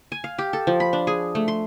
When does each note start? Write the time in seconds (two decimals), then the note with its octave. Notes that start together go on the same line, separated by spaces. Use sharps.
0.12 G#5
0.24 F5
0.38 G4
0.53 A4
0.67 F3
0.80 B5
0.93 D4
1.07 G#4
1.35 A3
1.48 C6